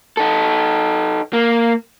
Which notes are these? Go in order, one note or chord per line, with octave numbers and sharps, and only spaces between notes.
D#4 A4
A#3